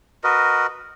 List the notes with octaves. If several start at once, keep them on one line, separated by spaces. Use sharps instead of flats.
F#4 A#4 B4 D#5